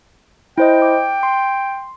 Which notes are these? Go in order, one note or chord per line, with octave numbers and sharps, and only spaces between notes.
E4 C5 D#5 G5
D6
C6